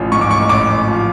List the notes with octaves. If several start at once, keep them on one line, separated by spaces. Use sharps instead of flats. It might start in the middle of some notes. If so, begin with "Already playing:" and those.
Already playing: A1 F3
G#2 C#6
D6
A1 C#6
A1 D6
A1
F3